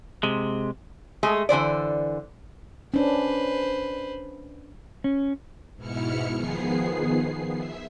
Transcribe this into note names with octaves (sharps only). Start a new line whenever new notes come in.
C3 G#3
G#3 A3 G#4
D3 E3 C5 D5
C#4 D4 B4 C5
C#4
G#2 B2 E4 F6 C#7
D#3 F3 B3 G#4 C7
E5